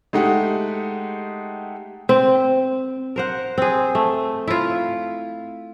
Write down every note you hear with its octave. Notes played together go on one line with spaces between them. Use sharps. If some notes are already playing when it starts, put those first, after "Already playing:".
G#3 A3 D#4 G4 F#5
C4
A#4 C5 F#5
C4 G#4
A3
E4 F4